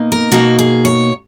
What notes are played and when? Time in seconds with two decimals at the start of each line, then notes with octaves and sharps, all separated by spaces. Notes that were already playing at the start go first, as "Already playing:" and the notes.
Already playing: B2 A#3 D#4
0.12 A#4
0.32 B2 A#3 D#4 F#4
0.59 G#4
0.85 C#5